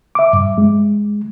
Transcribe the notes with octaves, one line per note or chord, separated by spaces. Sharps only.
E5 D6
G2
G#3